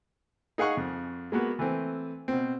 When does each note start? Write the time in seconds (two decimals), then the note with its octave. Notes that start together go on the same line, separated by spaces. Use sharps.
0.58 D#4 G#4 F5 F#5 C#6
0.77 F2
1.32 G#3 A#3 B3 F#4
1.59 E3 A3 C4
2.28 B2 C4